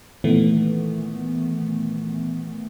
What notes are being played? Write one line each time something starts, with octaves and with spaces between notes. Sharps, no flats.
A#2 D#3 E3 A3 B3